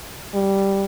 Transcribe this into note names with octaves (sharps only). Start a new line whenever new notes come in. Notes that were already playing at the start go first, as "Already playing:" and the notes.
G3